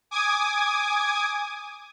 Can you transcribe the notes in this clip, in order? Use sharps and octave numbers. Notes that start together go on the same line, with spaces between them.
G#5 D6 D#6 G#6